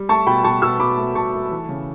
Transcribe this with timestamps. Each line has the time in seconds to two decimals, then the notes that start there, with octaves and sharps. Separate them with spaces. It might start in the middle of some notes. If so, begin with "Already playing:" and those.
Already playing: G3
0.09 A3 A5 C#6
0.27 B2 G5 B5
0.44 B2 A5 C#6
0.62 B2 C#6 E6
0.80 B2 B5 D6
0.97 A3
1.15 B2 A5 C#6
1.33 A3
1.51 E3
1.69 C#3